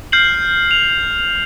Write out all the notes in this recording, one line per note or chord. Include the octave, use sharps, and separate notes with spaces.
F6 G6 C7 F#7
F7